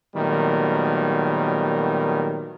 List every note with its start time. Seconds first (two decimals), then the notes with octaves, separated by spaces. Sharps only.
0.16 A#2 D#3 F#3 G3 A3 B3